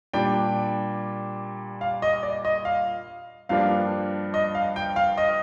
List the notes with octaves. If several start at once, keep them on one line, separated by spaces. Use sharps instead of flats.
A#2 G3 D4 G5
F5
D#5
D5
D#5
F5
G2 F3 A#3 D4 F5
D#5
F5
G5
F5
D#5